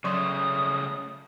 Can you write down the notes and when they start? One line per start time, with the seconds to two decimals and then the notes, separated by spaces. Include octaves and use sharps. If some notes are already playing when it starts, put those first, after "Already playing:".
0.04 C#3 F#3 A3 C6 D#6